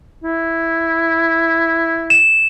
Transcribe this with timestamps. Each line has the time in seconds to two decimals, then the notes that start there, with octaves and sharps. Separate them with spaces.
0.24 E4
2.10 E7